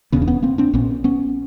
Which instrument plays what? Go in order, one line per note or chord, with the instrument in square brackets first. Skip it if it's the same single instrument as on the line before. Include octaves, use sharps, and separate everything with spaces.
[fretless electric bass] E1 E2 C#3 B3 C#4
D4
B3 C#4
A#3 C4
C4 D4
A#1 A#2 B3 C#4
B3 C#4